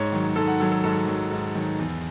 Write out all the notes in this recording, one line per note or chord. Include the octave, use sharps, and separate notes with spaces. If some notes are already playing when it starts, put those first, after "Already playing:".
Already playing: G#2 C#5
D#3 F#3
G#2 A4
F#5
D#3 F#3 A4
A4
G#2 A4
D#3 F#3
G#2
D#3 F#3
E2